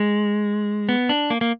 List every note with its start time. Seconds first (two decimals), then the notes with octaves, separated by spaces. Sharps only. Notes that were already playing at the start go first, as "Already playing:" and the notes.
Already playing: G#3
0.89 B3
1.09 D4
1.30 A#3
1.41 A#3